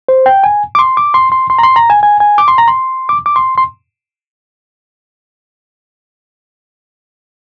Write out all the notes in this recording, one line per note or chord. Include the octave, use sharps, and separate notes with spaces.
C5
G5
G#5
D6
C6
D6
C6
C6
C6
A#5
C6
A#5
G#5
G#5
G#5
D6
C6
A#5
C6
D6
D6
C6
C6